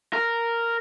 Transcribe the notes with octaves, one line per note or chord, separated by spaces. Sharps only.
A#4